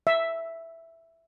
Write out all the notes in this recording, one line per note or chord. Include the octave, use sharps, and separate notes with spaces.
E5